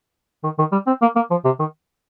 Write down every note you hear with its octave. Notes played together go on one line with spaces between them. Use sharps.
D#3
D#3
G3
C4
A#3
A#3
F3
C3
D#3